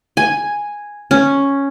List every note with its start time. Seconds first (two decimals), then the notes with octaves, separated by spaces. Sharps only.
0.17 G#5
1.11 C#4